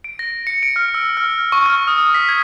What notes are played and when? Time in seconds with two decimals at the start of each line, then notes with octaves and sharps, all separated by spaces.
0.04 D7
0.19 A#6
0.47 C#7
0.63 D7
0.76 F6
0.94 E6
1.17 F6
1.52 C#6
1.66 F6
1.88 D#6
2.14 B6
2.29 G#6